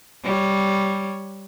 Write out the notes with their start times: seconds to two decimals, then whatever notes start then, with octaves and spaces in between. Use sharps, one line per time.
0.24 G3 C#5